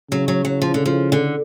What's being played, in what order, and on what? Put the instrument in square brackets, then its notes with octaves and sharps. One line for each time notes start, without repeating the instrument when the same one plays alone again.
[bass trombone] C#3 [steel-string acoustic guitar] F#3
[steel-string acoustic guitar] F#3
F#3
F3
D3
F3
D3